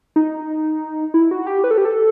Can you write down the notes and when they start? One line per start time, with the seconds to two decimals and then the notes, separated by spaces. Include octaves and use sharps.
0.16 D#4
1.14 E4
1.31 F#4
1.47 G4
1.64 B4
1.71 A4
1.78 G4
1.85 A4